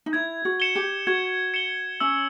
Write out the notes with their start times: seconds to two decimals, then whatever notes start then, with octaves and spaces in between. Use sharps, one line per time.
0.06 D#4
0.13 E4 G#6
0.45 F#4
0.60 C#7 E7 G7
0.76 G4
1.07 F#4 G#6
1.54 C#7 E7 G7
2.00 C#4 E6